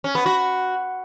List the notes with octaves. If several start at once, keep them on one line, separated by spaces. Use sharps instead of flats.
C#4
B3
F#4